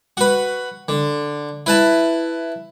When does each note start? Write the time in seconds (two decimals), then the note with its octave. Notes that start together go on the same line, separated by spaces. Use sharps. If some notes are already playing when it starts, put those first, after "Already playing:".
0.17 F#4 B4
0.88 D3
1.66 E4 B4 A5